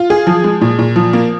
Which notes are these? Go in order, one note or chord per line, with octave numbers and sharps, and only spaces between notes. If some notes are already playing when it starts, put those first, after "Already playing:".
Already playing: F4
G#4
F3
G#3
A#2
A#2
F3
A#3